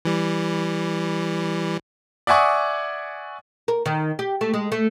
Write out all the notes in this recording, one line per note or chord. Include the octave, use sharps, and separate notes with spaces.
E3 G3
D5 E5 F#5 G#5 C#6 D#6
A#4
D#3
G4
A3
G#3
A3